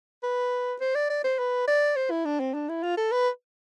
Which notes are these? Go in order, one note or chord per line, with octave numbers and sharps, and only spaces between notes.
B4
C5
D5
D5
C5
B4
D5
C5
E4
D4
C4
D4
E4
F4
A4
B4